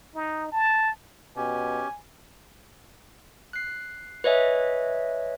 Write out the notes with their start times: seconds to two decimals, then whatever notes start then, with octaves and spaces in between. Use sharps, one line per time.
0.15 D#4
0.52 A5
1.36 B2 C#4 G4 G#5
3.53 F#6 C7
4.24 B4 C#5 D#5 E5 G#5